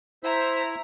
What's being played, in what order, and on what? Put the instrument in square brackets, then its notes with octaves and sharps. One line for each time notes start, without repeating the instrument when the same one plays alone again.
[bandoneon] E4 [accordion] C5 E5 [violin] A#5